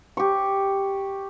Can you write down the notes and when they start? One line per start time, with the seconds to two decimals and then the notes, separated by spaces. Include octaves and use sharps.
0.17 G4 C#6